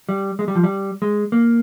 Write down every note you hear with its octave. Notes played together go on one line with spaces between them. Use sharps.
G3
G#3
G3
F3
G3
G#3
A#3